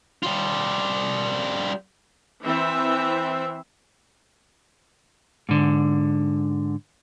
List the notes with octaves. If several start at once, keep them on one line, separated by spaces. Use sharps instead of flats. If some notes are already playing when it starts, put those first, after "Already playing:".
G3 F4
E3 C4 E5
G#2 D3